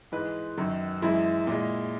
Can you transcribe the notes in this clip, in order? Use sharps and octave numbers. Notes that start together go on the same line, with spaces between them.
G#2 E3 G#3 B4
F#2 D#3 F#3
F#2 E3 G#3 E4
A#2 G#3